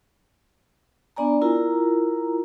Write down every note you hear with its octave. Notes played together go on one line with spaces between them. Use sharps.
B3 D4 D5 G#5 A#5
E4 F4 A#4 A#5